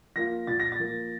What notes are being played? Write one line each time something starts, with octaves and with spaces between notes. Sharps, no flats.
F3 A#3 F4 A#6
A#2 A6
A#6
A6
F3 A#3 F4